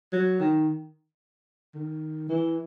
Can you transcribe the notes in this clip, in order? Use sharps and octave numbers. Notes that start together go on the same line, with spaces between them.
F#3
D#3
D#3
E3